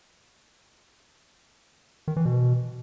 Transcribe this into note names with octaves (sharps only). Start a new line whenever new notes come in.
D#3
E3
B2